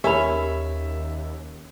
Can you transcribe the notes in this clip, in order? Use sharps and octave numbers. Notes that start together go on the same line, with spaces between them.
D#2 C#4 G4 A#4 E5 B5